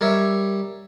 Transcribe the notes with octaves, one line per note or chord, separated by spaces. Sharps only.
G3 A#4 C#5 E5